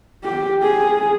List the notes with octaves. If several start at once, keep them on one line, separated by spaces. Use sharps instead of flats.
G4
G#4